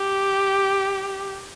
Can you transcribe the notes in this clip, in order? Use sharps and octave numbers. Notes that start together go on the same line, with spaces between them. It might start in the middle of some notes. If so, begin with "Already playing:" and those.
Already playing: G4